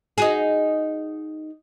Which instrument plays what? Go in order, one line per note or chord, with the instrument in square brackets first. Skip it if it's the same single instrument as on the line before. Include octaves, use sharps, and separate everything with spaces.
[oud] D#4 F#4 G#4